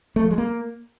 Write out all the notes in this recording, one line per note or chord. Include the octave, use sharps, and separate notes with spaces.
A3
F3
G#3
A#3